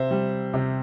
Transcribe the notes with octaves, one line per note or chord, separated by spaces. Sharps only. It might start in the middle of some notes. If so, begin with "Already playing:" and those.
Already playing: C3 C5 E5
G3
C3